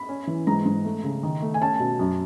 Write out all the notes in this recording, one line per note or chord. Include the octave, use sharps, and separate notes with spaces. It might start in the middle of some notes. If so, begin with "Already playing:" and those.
Already playing: B5
C#4
E3
G#2 A#5
G#2
A3
C#3
D#3
A3
G#5
C#4 A5
B2
F#2